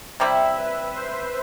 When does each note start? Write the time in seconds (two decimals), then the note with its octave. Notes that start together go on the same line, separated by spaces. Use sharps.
0.20 C3 G3 C4 E4 E5
0.57 B4
0.95 C5